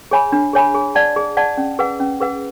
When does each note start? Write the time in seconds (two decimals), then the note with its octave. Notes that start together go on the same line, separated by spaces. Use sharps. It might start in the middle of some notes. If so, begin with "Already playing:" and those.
0.11 G#4 C#5 G#5 B5
0.32 D4
0.53 G#4 C#5 G#5 B5
0.75 G#4
0.95 D5 F#5 A5
1.16 G#4
1.37 D5 F#5 A5
1.57 C#4
1.79 G#4 B4 F#5
2.00 C#4
2.21 G#4 B4 F#5